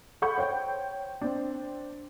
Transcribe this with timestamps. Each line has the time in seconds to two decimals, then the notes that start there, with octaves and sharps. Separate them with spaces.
0.22 A4 F#5 B5 C#6 G6
0.38 C5 C#5 G5
1.21 C4 D4